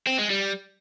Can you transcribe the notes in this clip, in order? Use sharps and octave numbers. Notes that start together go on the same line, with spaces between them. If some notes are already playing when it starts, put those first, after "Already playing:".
C4
G#3
G3